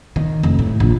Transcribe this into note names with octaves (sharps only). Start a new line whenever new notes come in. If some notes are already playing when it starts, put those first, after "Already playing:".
D#3
F1
A2
A#1